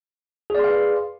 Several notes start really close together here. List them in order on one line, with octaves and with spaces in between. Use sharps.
G#4 D5 C6 F5 B4